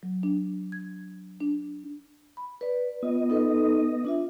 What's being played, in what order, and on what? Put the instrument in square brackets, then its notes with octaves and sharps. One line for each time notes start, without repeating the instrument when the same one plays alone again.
[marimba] F#3
D4
G#6
D4
[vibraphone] B5
B4 D5
[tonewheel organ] B3 D#5 [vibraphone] F4
[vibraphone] D#4 A4 B4
D4 F4 E5